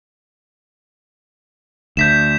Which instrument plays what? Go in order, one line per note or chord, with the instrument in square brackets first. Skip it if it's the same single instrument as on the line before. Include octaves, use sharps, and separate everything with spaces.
[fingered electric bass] D2 [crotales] G6 B6 E7